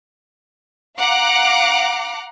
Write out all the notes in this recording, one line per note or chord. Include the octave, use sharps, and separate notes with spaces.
F5 F#5 A#5 D6